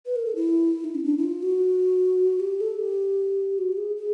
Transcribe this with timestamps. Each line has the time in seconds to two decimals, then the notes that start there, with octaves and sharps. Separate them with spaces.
0.06 B4
0.16 A#4
0.25 A4
0.35 E4
0.84 D#4
0.95 C#4
1.04 D4
1.18 E4
1.24 F4
1.43 F#4
2.40 G4
2.61 A4
2.79 G4
3.58 F#4
3.72 G4
3.77 G#4
3.96 G#4